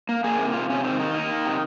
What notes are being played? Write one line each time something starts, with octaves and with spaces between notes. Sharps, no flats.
A#3
A#3 G#4
C3
C3 F4
C3 C#4
D#3 C4
A#3 D#4
A#3
D#3
C3